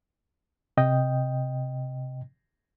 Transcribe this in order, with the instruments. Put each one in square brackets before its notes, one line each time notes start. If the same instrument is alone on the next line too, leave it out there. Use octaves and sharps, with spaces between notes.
[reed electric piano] C3 D#5 G5